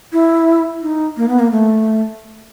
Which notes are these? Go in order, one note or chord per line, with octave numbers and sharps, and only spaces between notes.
E4
D#4
A#3
B3
A#3
A3